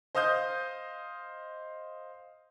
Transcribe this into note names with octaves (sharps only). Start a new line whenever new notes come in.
C5 D#5 F5 D#6 G6